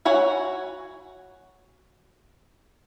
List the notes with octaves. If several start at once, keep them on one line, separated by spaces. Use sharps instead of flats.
F#4 C#5 F#5 G#5